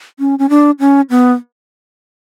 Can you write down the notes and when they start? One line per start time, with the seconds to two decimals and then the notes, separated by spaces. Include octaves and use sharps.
0.19 C#4
0.39 C#4
0.50 D4
0.80 C#4
1.10 B3